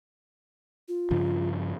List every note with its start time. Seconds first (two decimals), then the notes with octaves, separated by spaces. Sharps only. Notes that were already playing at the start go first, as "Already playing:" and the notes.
0.88 F4
1.11 G2 C#3 F3